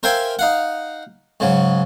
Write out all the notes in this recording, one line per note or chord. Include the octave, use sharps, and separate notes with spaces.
A#4 C5 E5 F5 G5 G#5
D#4 F5 F#5
G#2 C#3 F#3